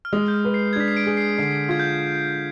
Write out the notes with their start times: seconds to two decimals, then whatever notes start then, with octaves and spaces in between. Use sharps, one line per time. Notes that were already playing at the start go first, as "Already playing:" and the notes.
0.05 F6
0.13 G#3 D#6
0.28 G6
0.34 F6
0.44 B4
0.54 C7
0.73 G#6
0.76 D4 B6
0.88 C7
0.97 D7
1.06 G#4
1.17 C7
1.38 D3 C7
1.69 F4 G#6
1.79 G6